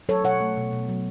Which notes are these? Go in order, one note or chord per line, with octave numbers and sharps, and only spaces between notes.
F#3 A4 C#5
B2 C#5 F#5
A3
B2
B2
F#3